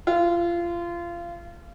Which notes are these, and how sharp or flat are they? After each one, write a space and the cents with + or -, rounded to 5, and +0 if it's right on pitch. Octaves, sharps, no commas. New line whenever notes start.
F4 -25